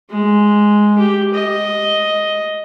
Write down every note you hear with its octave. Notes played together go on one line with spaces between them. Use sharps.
G#3
G4
D#5